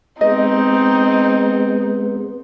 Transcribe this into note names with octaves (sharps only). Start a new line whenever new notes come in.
G#3 B3 C4 D#4 D#5